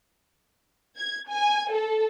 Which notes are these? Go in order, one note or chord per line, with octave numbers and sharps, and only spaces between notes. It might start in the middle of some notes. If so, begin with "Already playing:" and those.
G#6
G#5
A4